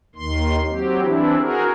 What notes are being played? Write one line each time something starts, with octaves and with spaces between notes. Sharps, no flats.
D#2 D#3 C6
F#3 C4 G4
E3 C4 D4 E4
F#4 G#4 A#4